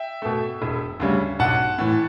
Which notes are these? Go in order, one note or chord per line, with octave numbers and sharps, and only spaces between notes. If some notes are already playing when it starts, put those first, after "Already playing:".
Already playing: E5 G5
B2 A3
E1
D2 C#3 G3
B1 F#5 A5
A2 E3